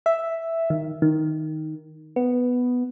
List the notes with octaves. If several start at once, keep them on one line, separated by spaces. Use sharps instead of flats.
E5
D#3
D#3
B3